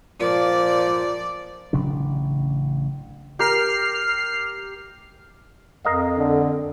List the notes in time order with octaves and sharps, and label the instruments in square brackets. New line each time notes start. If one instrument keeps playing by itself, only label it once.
[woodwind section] A#2 F3 [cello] D5
[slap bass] A1 C#3 F#3 D4
[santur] G4 A#4 [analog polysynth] F6 C7
[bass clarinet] F2 [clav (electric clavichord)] A#4 D#5 F5
[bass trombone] D3